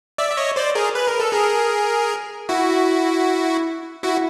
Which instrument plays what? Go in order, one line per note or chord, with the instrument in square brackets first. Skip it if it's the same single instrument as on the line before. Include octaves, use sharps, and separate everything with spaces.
[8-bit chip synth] D5 E5
E5
C#5 D#5
C5 D5
G#4 A#4
B4
A#4
A4
G#4 A#4
E4 F#4
E4 F#4